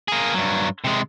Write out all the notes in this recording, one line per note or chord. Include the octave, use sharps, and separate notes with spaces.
A#3 G#4
G2 F#3
C3 G#3